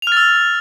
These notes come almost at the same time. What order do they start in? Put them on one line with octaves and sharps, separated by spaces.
F7 F6 A6 E6